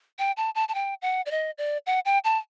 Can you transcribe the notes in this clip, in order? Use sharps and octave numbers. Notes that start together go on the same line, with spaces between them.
G5
A5
A5
A5
G5
F#5
D5
D#5
D5
F#5
G5
A5